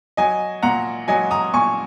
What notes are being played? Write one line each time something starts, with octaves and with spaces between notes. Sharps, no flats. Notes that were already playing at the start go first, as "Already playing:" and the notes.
F#3 D#5 G#5
A#2 F#5 A#5
F#3 D#5 G#5
A#5 D#6
A#2 G#5 C#6